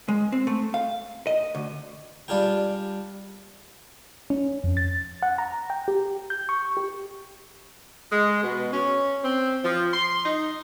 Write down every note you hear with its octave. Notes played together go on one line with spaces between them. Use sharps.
G#3
C4
A3
F5
D#5
D2
G3 D4 F4 G#4 G5
C#4
F2
A6
F#5
A#5
G5
G4
G6
C#6
G4
G#3
B2
C#4
C4
F3
C6
D#4